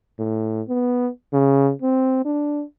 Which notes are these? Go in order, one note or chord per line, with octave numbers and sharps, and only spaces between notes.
A2
B3
C#3
C4
D4